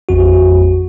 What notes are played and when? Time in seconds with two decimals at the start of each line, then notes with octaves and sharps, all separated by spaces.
0.09 A1 F2 F#4